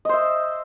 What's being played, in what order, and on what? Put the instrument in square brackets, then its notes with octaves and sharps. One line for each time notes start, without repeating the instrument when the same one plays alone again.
[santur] D#5
C5
E5